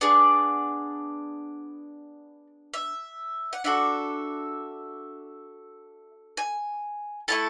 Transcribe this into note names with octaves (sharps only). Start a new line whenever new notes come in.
B3 D4 G#4 D5
E5
F#5
D4 F#4 A4 E5
G#5
A3 E4 A4 A5